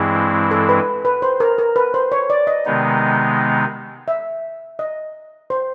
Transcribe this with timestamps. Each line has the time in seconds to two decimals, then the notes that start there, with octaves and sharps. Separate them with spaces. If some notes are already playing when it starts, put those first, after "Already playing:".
Already playing: G2 E3 G#3 C4 E4 G#4
0.51 A4
0.69 B4
1.05 B4
1.22 C5
1.40 A#4
1.58 A#4
1.76 B4
1.94 C5
2.12 C#5
2.30 D5
2.47 D#5
2.65 C3 D#3 G#3 B3 D#4
4.08 E5
4.79 D#5
5.50 C5